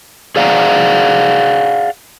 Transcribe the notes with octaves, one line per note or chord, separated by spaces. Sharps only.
G#4 D5 F5 F#5 A#5